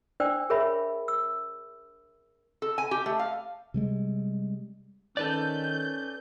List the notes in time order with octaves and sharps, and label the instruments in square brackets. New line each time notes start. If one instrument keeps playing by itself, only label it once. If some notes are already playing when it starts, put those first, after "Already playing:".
[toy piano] D4 C5 D5 G5 E6
G#4 A#4 C#5 E5 B5
E6
[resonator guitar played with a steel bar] A4
G#5
G4
A3
F5
[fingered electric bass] C3 G3 G#3
[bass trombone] D#3 [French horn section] C#4 [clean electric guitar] A4 B4 D5 [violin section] G6